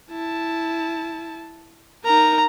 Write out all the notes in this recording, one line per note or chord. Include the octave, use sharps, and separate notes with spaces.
E4 A5
D#4 A#4 A#5